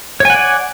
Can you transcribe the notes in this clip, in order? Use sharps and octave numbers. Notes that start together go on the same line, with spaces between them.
C#5 D5 F#5 G#5